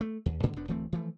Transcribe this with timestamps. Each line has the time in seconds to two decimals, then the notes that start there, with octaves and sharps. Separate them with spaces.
0.01 A3
0.26 D#2
0.43 G#2 D3 E3
0.56 F1 F#2 B3 D4
0.68 D1 E3 A3 C4
0.92 E3 F3 A3